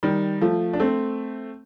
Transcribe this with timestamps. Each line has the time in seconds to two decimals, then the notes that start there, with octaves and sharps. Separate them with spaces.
0.03 D#3 G3
0.41 F3 A3
0.73 D4
0.80 A3 C4